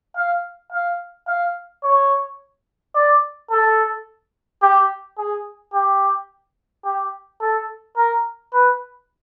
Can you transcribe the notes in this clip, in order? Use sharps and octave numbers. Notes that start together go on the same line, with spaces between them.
F5
F5
F5
C#5
D5
A4
G4
G#4
G4
G4
A4
A#4
B4